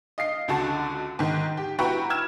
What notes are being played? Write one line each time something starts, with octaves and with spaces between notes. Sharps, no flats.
D#5 F5 C7
C#2 D3 F#4 A5
G#2 D#3
G4
E4 F#4 B4 G5 A#5 C#6
E6 F6 G#6 E7